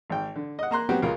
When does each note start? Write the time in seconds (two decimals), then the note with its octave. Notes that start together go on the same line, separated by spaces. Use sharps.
0.10 G#1 G5
0.35 D3
0.59 D#5 F#5
0.71 A#3 A#5 C6 F#6
0.89 F#3 B3 C4 F#4 G4
1.02 C#2 G#3 F4 A#4